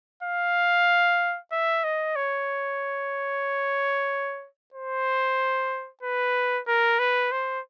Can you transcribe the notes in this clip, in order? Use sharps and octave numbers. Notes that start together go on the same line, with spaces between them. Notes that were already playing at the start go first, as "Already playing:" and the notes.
F5
E5
D#5
C#5
C5
B4
A#4
B4
C5